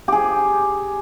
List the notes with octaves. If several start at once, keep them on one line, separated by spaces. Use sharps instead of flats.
G4 G#4